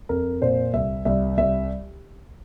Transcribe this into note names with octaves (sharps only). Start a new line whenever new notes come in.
F2 A#4
A#2 C5
C2 E5
C2 E5
C2 E5